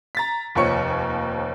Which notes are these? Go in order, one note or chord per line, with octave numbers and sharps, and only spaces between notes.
A#5 A6 B6
F1 D#2 F3 C#5 C#6 C#7